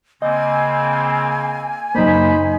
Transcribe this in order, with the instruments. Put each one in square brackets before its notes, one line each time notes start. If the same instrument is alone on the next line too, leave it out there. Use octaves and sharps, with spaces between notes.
[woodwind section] C#3 A#3 C4 [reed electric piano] D#5 [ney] G#5
[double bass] F#1 D#4 [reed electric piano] F#3 A#3 [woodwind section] C5 B5